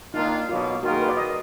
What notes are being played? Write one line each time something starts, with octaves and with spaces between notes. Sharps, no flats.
D#3 A#3 D4 D#4 F4
B2 F#3 A#3 F4
D#3 A#3 F4 F#4 A#4
G#4
B4
D5
D#5